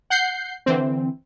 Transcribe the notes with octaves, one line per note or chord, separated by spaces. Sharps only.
F#5 G6 C7
D3 E3 C4